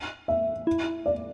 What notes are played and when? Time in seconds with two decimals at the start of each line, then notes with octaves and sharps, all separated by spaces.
0.28 E5
0.67 E4
1.06 D5